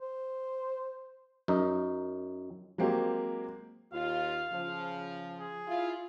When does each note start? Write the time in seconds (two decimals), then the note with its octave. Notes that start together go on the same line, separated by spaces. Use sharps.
0.02 C5
1.48 F#2 D#4
2.78 F#3 G#3 A#3 C4 G4
3.92 D#2 F4 F5
4.52 C#3 F3
5.39 G#4
5.68 E4 F4